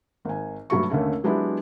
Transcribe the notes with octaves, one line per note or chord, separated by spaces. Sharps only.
G#1 G#5
G2 F#3 A3 C#6
D#2 D3 A3 C#4
F#3 G#3 B3 D4 E4 G4